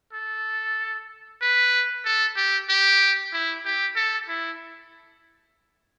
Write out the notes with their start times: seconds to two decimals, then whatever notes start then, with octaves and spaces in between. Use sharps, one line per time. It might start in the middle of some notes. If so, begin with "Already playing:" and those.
0.13 A4
1.41 B4
2.05 A4
2.36 G4
2.69 G4
3.33 E4
3.65 G4
3.96 A4
4.29 E4